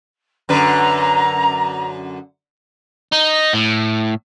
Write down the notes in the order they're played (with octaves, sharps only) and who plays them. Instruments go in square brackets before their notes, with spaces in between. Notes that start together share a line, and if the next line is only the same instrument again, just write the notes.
[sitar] F#2 D3 B4 [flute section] A#5
[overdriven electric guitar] D#4
A2